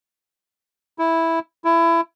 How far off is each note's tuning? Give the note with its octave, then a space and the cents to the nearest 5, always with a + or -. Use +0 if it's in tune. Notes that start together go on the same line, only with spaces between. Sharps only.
E4 -5
E4 +20